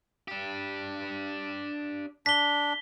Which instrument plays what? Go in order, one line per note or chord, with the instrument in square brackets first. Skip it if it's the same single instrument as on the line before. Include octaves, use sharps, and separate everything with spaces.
[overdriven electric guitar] D4 G4
[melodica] D4 [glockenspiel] B6 G7